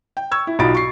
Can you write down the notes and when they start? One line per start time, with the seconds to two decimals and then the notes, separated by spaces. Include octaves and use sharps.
0.17 G5
0.31 C#6 E6 G#6
0.47 E4
0.59 B1 D#4 F4 B5 A6 D7
0.75 C#6 C7